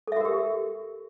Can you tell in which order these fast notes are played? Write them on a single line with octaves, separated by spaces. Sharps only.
A4 E5 F#4 A#4 G4